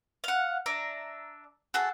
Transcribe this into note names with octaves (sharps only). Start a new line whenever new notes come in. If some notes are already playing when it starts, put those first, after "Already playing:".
F5 F#5
D4 E5 A#5
F#4 G#4 A4 A5